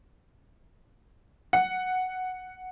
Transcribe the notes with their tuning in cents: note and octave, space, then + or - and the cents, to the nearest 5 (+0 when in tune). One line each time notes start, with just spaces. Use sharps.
F#5 +0